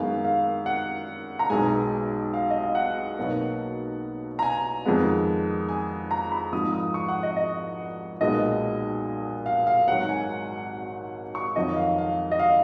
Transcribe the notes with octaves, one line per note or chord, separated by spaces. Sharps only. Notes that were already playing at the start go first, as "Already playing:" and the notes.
Already playing: F#2 D#3 G#3 B3 F5
F5
F#5
A#5
B1 B2 G#3 G#5
F5
D#5
F5
F#5
B1 B2 F#3 A#3
A#5
G#5
F2 D#3 G#3 B3
G#5
A#5
B5
G#1 G#2 F3 D#6
D#6
C#6
F#5
D#5
D#5
B1 A#2 G#3 B3 D#5
F5
F5
G#1 G#2 F#3 F#5
G#5
C#6
F2 D#3 F#3 D#5
F5
F5
D#5
F5